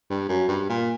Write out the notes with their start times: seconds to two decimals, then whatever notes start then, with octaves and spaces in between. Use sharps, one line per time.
0.10 G2
0.29 F#2
0.48 G2
0.69 A#2